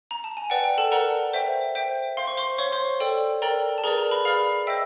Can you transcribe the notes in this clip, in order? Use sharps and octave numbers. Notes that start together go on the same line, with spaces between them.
A#5
A5
G#5
B4 D5 F#5 G5
G5
A4 A5
A#4 B4 D5 F#5 A#5
C5 E5 G5
C5 E5 G5
C5 F5 C6
C#6
C5 C6
C5 C#5 F5 C#6
C5 C6
A4 D5 G5
A4 A#4 D5 G5 A#5
A5
G#4 A#4 B4 D5 A#5
A#4 A#5
B4 B5
G#4 B4 D5 F5 F6
C5 D#5 E5 G5 E6